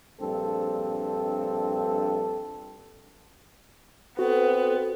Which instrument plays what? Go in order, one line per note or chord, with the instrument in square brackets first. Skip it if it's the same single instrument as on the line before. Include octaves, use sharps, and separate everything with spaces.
[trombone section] A#1 G2 C4 A4
[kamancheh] B3 [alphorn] C4 [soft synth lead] F#4 [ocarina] A4